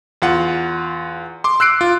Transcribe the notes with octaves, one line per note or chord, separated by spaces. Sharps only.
E2 F4 F#5
C6 D6
E6 F#6 C7 D7
F4